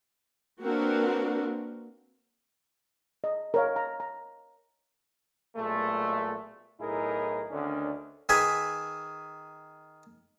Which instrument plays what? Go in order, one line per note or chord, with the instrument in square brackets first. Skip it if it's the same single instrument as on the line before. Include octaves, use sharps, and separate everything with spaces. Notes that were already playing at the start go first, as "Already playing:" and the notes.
[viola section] A#3 C4 D4 F#4 A#4 B4
[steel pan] D#5
A#4 C#5 F5
A#5
A#5
[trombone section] B1 A#2 G#3 A3
B1 A2 D#4 E4 G#4 A#4
D2 D3 D#3 C#4 D4
[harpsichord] D#3 G#4 B4 E5 G#5